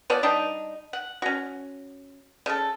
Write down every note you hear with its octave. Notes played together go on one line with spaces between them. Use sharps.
F3 B3 C#5 D5
G3 D4 D#4
F#5
C#4 F#4
C#3 A4